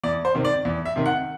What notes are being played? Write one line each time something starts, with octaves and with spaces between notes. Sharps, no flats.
E2 D5
C5
C3 D#3
D5
E2
E5
C3 D#3
F#5